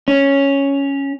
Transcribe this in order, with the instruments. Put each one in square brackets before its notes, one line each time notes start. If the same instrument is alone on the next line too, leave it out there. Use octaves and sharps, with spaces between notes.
[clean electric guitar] C#4